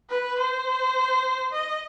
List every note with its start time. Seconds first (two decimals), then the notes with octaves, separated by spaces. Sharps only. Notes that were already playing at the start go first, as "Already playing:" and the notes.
0.09 B4
0.39 C5
1.53 D#5